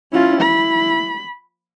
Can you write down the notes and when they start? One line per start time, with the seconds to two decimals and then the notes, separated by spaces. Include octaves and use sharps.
0.13 C#4 E4 F4
0.41 B5